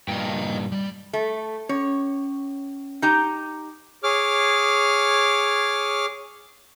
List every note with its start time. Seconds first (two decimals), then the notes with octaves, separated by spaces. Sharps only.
0.08 G2 A#2 D#5 G5
0.72 G3
1.13 A3
1.69 C#4 C#5
3.02 D#4 G4 A#5
4.03 G#4 C#5 D6 F6